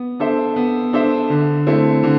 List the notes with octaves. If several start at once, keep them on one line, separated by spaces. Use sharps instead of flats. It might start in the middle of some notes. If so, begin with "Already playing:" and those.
Already playing: B3
D4 A4 C5 E5
B3
D4 A4 C5 E5
D3
A3 C4 E4
D3